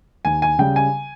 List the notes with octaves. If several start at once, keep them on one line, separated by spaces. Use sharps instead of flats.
D#2 G#5
G#5
C#3 G3 G5
G#5